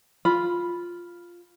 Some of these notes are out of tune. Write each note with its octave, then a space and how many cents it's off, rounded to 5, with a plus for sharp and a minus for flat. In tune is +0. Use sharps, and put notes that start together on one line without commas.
F4 +0 B5 -5